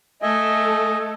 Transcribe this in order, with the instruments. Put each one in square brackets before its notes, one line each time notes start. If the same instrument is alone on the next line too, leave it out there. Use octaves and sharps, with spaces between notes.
[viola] A3 A4 [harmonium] D#5 E5 G#5